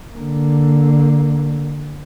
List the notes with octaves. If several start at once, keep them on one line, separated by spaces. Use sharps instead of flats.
D3 A#3